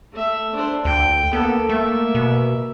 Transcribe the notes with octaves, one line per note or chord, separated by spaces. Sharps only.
A3 E5
D4 C5
D2 G5
A#3 B3 A4
A3 A#3 E5
B2